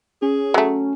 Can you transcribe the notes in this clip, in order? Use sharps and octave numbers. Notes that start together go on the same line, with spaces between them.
C#4 G#4
F#3 A3